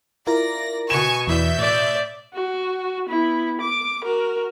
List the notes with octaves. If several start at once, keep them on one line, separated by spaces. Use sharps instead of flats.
E4 F4 A#4 D5 A#6
B2 G#5 C#6 G#6 E7
E2 E3 D5 E5 G6
A2 D5
F#4
B3 E4
D6
F#4 A#4